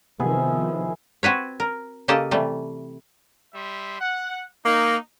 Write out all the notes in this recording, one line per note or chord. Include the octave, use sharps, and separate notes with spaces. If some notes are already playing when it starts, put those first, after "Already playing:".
C3 D#3 F3 B3 E4 G#4 E5
C4 F#4 B4 C#5
A#4
C#3 A#3 G4 A4 D#5 A5
C3 E3 G3 A3
G3 E5 C6
F#5
A#3 D#4